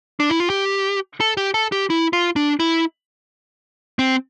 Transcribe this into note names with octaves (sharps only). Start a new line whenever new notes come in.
D4
E4
F4
G4
A4
G4
A4
G4
E4
F4
D4
E4
C4